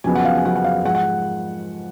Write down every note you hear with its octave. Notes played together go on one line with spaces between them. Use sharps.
F2 C#3 F#3 B3 G#5
F#5
F5
G#5
F2 C#3 F#3 B3 F#5
F#5
F5
G#2 F3 G#3 F#5
F#5